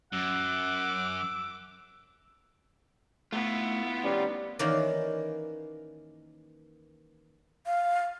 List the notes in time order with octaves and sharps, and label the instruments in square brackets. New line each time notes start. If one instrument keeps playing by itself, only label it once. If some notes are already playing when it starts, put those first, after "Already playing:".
[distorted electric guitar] F#2 [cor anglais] F#5 [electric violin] D6 [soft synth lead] E6
[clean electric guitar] A3 [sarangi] B3 [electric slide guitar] E4 F4
[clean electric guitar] D#3 C#4 [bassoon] G3
[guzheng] D#3 E3 A#3 C#4 D5
[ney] F5